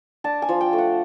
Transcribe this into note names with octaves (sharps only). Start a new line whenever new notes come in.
D4 A5
G#5
F3
G5
A3
F#5